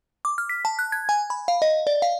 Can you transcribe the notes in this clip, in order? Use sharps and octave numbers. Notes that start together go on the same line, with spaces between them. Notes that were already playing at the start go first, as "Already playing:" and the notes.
D6
F6
B6
A5
F#6
G#6
G#5
B5
F5
D#5
D5
F5